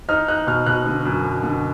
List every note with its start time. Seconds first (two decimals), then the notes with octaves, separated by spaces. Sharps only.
0.09 D#4 F6
0.28 D#4 F#6
0.47 B2 F6
0.66 B2 F#6
0.87 D3
1.05 F#2
1.25 F#2
1.43 D3